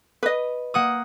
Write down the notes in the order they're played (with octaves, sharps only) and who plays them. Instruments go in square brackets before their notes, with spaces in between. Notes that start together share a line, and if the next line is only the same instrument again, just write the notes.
[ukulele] B4 D#5
[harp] A#3 F#5 D#6